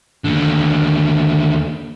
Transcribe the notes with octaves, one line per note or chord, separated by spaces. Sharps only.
D#2 D3